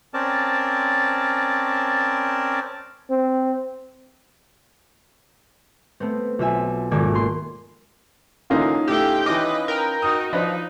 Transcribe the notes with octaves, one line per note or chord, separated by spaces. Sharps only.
C4 C#4 A#4 D5 A5
C4
A3 B3 C4
B1 F4 E5 G#5
D#1 G#1 A4 D5 D6 G#6
A#3 C6
D3 E3 A#3 C#4 D#4 F4
A2 A3 G4 F5 G5 E6
E3 B4 D#5 D6
A#4 G5
D#4 F#4 D#6
F3 D4 D#4 B4 D#5